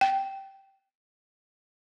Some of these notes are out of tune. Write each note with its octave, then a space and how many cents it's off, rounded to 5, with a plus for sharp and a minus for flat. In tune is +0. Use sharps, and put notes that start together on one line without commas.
G5 -5